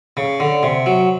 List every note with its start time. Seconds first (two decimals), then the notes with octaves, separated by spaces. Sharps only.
0.17 C#3
0.40 D3
0.63 C3
0.86 F#3